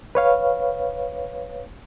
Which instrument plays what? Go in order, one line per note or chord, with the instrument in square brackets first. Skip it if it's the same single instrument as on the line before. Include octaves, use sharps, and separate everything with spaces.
[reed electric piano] B4 C#5 F5